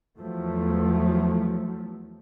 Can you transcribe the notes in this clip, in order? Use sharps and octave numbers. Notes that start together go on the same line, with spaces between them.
E2 F3 F#3 A3